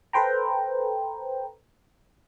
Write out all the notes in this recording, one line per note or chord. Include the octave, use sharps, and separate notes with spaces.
A4 B4 C5 G5 A#5